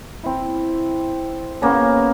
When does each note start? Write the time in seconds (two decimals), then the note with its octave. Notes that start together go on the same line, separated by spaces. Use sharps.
0.23 C4 E4
1.62 C#3 A#3 B3 C#4